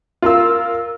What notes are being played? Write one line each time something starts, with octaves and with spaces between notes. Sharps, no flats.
F4 A#4 E6